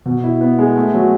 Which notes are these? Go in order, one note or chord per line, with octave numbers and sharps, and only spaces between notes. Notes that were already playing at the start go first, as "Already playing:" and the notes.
B2
E4
B3
G#3
A3
F#3